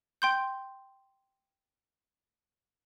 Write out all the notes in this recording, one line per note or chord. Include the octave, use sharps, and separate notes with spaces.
G5 C6 G6